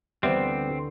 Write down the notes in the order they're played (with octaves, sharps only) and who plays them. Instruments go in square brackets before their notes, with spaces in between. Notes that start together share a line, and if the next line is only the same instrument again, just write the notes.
[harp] D2 E3 [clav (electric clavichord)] G3 B3 [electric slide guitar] C4 [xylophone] C5 E5